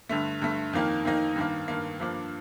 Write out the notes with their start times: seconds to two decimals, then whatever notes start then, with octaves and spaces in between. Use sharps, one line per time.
0.09 G2 D3 A3
0.42 G2 D3 A3
0.73 F2 D#3 A#3 D#4
1.05 F2 D#3 A#3 D#4
1.36 G2 D#3 A#3
1.68 G2 D#3 A#3
1.99 G2 F3 A#3 D4